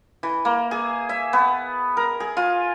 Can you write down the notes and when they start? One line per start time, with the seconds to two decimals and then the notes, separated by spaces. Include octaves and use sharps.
0.23 E3
0.45 A#3
0.71 G#4
1.09 E5
1.33 B3
1.97 A#4
2.20 G#4
2.37 F4